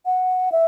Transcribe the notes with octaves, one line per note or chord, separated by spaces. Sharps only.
F#5
E5